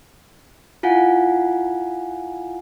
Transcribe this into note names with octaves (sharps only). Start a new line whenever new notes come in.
E4 F4 F5 F#5 G#5